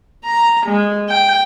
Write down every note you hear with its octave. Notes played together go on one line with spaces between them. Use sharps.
A#5
G#3
G5